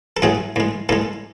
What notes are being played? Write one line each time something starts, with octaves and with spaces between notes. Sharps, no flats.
A4
A2 F#3 A3 G#4
A2 G#3
A2 G#3 A4